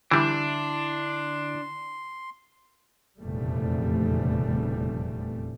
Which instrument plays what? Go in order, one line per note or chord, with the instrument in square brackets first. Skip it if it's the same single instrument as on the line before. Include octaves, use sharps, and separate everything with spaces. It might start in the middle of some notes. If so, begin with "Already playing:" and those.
[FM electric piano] D3 E4 [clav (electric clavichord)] E3 G3 [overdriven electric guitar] D4 [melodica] C6
[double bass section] F1 E2 A#2 C#3 G3 A3